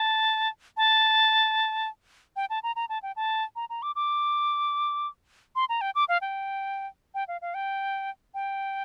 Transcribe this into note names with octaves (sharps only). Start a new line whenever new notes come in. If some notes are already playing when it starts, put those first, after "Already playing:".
Already playing: A5
A5
G5
A5
A#5
A#5
A5
G5
A5
A#5
A#5
D6
D6
C6
A#5
G5
D6
F5
G5
G5
F5
F5
G5
G5